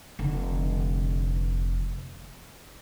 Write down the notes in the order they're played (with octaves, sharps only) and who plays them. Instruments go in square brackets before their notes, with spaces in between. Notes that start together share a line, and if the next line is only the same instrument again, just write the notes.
[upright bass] F1 D3